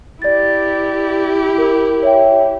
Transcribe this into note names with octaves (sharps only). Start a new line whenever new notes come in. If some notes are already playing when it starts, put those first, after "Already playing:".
E4 G4 D5 A6
A#4
C#5 E5 G5